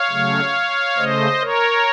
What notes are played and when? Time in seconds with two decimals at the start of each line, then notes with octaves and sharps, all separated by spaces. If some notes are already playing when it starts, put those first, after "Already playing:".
Already playing: C#5 F5
0.10 C#3 F#3 A3
0.97 C#3 A3 C5 D#5
1.41 A#4 C#5